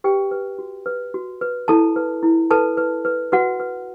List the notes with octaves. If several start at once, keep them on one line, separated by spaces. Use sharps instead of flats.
G4 B4 G5
B4
F#4
B4
F#4
B4
E4 A4 A5
B4
E4
A4 B4 A5
B4
B4
F#4 B4 F#5
B4